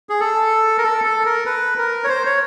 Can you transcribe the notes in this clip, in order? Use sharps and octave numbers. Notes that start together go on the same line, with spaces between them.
G#4
A4
A#4
A4
A4
A#4
B4
A#4
C#5
C5
C#5